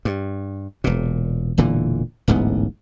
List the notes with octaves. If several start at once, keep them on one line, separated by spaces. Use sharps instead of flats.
G2
E1 A#2
E1 A#2 D3 E3
D1 A1 G#2 B3